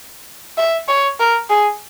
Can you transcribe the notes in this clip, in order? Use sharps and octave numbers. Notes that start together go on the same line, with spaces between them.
E5
C#5
A#4
G#4